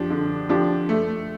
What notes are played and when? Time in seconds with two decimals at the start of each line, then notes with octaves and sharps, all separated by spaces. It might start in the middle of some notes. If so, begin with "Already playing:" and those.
Already playing: F3 D4 G4
0.10 D3
0.49 F3 D4 G4
0.89 A3